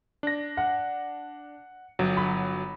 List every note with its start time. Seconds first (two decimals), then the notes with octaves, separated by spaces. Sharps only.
0.23 D4 A#6
0.57 F#5
1.99 G1 F#3
2.17 B5